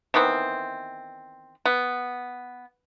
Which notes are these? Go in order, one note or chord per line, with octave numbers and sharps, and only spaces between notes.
D#3 E3 B3 C4
B3